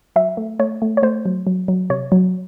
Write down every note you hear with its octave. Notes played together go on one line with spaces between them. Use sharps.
F#3 E5
A3
A3 C#5
A3
C#5
A3 C5
F#3
F#3
F#3
C3 C#5
F#3